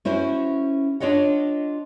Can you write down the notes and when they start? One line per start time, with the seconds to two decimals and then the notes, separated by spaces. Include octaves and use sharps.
0.05 C#4 E4 F#4 C5
1.00 D4 F4 C#5 D#5 F#5